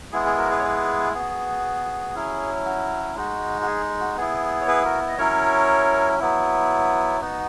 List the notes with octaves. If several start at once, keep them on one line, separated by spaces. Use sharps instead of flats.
G#3 B3 E4 G#4
G#4
F#4 A#4
G#4 B4
C#5
G#4 B4
B3 G#4
F#4
F#3 C#4 E4
F#4
G#3 D#4 F#4
F#4
G#4
F#4
B3 E4 G#4
C#5
G#4 B4
F#4 A#4
D#5
F#3 C#4 E4 A#4 C#5
F#3 B3 E4
B3 D#4 F#4